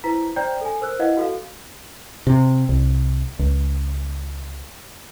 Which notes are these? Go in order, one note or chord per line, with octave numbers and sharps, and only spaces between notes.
E4 B4 C5 A#5 B6
C5 D5 G5 A#5 G6
A4 G#5
A#4 C5 E6 F#6
E4 B4 D#5 F5 F#5
F#4 A4 F5
C3
C2
C#2